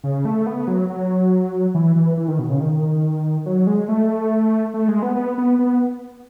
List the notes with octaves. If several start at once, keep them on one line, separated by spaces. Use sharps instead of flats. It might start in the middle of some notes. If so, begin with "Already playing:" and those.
C#3
A3
B3
F#3
F#3
E3
E3
E3
D#3
B2
C#3
D#3
F#3
G#3
A3
A3
G#3
B3
B3
B3
B3